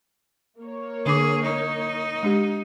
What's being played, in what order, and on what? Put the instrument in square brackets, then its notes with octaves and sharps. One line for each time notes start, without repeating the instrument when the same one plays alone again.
[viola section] A#3 A#4 C#5
[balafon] D3 D4 D6 [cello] G#4
[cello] D#4
[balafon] G#3 D4 G4